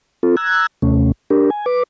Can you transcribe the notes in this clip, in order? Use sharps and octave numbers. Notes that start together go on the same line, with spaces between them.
C4 F4 A4
A#5 E6 F#6 G#6
D#2 C3 A3 C#4
D4 G4 A#4
G#5
B4 D6